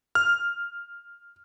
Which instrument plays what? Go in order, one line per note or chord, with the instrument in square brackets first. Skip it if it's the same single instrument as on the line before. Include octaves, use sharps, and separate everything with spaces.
[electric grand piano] F6